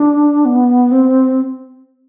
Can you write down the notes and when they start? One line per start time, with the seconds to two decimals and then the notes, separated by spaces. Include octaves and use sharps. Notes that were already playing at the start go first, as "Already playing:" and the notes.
Already playing: D4
0.45 B3
0.91 C4